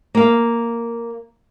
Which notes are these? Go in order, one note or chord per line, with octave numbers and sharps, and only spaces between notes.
A#3 F5